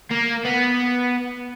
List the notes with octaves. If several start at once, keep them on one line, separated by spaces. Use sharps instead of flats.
A#3
B3